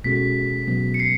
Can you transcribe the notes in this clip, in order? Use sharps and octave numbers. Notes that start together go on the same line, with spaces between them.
B2 G#3 C#4 F#4 A4 B6
B2 F#3 B3
C#7
C7